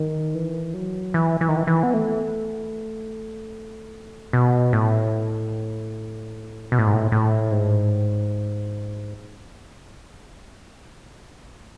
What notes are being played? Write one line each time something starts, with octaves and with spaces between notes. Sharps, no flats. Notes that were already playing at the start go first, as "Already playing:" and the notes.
Already playing: D#3
E3
F#3
E3
E3
D#3
E3
E3
B3
A3
B2
A2
B2
A2
G#2
A2
A2
G#2